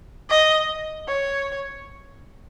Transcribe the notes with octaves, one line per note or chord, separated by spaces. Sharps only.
D#5
C#5